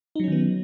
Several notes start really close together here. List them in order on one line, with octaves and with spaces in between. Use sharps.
D#4 F#3 C#4 D#3 B3